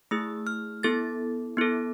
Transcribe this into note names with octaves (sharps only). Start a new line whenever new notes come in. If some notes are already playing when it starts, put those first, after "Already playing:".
A3 E4 G#4 E6
F6
B3 E4 A4 A6
B3 E4 A4